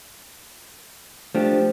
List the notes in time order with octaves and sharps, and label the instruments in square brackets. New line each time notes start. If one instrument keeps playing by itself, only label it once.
[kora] F3 [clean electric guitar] A3 D4 G4